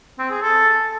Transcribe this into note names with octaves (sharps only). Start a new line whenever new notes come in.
C4
G#4
A4